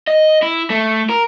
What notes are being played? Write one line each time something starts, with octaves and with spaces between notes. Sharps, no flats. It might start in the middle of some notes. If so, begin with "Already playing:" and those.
D#5
E4
A3
A#4